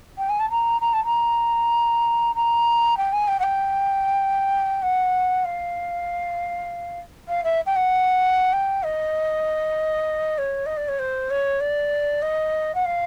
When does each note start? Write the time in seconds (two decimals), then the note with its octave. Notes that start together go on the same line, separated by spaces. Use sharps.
0.17 G5
0.29 G#5
0.39 A5
0.50 A#5
0.81 A#5
0.93 A5
1.05 A#5
2.35 A#5
2.97 G5
3.12 G#5
3.27 G5
3.39 F#5
3.43 G5
4.82 F#5
5.44 F5
7.28 F5
7.44 E5
7.66 G5
7.76 F#5
8.53 G5
8.83 D#5
10.38 C#5
10.66 D#5
10.76 D5
10.88 C#5
10.99 C5
11.30 C#5
11.60 D5
12.22 D#5
12.74 F#5
12.85 F5